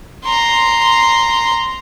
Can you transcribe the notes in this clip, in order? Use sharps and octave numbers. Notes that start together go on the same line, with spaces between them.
A#5 C6